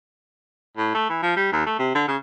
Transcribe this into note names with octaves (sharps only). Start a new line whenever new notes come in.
A2
A3
E3
F3
G3
D#2
A3
C3
D3
C#3